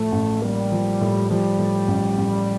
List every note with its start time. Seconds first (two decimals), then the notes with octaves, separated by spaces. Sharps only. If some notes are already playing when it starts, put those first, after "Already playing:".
Already playing: A2 F3 A3
0.12 A1
0.42 G3 A#3
0.71 F3
1.01 A2
1.30 F3 G3
1.59 A2
1.88 A1
2.18 A1